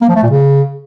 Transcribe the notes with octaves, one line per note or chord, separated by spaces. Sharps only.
A#3
F3
A3
A#2
C#3